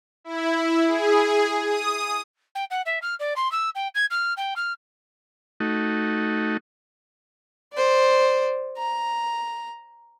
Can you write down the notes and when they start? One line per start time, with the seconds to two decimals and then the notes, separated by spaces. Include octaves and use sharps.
0.24 E4
0.88 G#4
1.64 D#6
2.55 G5
2.70 F#5
2.86 E5
3.02 F6
3.19 D5
3.36 C6
3.52 E6
3.75 G5
3.95 G#6
4.10 F6
4.37 G5
4.56 F6
5.60 A3 D#4 F#4
7.73 C5 D5
8.77 A#5